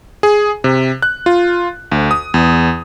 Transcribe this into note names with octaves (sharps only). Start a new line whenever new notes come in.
G#4
C3
F#6
F4
D2
D#6
E2